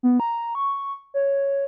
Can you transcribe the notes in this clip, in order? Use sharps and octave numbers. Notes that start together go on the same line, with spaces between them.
B3
A#5
C#6
C#5